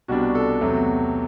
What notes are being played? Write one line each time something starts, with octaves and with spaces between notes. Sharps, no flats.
C2 B2 G3 D4 F#4
A4
E2 C3 F#3 A3